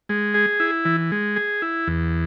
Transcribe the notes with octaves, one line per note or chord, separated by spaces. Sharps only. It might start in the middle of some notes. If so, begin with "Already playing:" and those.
G#3
G#4
E4
E3
G#3
G#4
E4
E2